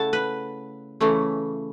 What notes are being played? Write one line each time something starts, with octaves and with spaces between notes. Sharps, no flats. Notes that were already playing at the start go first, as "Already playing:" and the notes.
Already playing: C#3 A3 E4 F#5 A5
B4
C#3 E3 A3 C#4